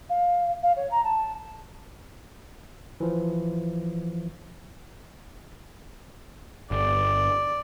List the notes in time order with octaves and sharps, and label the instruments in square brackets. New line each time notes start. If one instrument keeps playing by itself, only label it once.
[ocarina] F5
F5
C#5
A#5
A5
[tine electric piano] E3 F3
[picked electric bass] G1 [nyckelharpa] D5